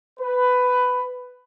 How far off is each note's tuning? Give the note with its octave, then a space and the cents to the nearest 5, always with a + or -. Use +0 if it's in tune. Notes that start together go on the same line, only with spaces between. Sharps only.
B4 +15